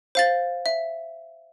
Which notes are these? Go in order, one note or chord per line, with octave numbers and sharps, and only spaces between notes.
C5 F5 A6
E5